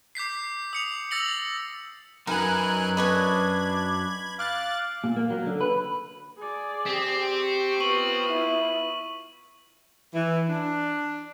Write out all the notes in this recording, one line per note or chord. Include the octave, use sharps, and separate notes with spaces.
D6 G6 B6 C7
D#6 C#7 F7
E6 A6 A#6 C#7 F#7
F#2 F#3 D#4 A#4 B4 G#5 F#6
D4 B4 C#5 D#5 B5 G#6
F5 D6 F#6 A6
A#2
A#3
F#3
D3
B4
G#4 D5
C4 G4 B6
C#6
B3 F4 C#6 D#7 F#7
E4
E3
D4